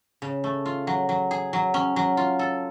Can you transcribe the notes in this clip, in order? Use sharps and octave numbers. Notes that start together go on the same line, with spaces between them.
C#3
A3
F4
F#3
F#3
G#4
F#3
C#4
F#3
F4
A4